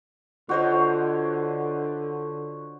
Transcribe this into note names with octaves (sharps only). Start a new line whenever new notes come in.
D3 F4 F#4 C5 C#5 D#5